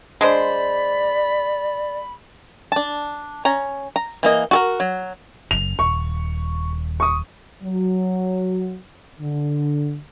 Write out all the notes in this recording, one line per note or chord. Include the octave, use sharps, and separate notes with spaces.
G#3 D4 C5 D5 B5
D4 A5
C#4 A#5
A#5
E3 A#3 D#5
F#4 A4 A#4
F#3
F#1 F#2 F7
D#1 C#6
C#6 D#6
F#3
D3